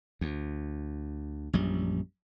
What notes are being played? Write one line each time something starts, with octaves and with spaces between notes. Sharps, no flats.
D2
A#1 F#2 G3